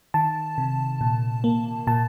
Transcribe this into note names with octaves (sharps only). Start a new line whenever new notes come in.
D#3 A5
C3
A#2
A#3
A#2 A5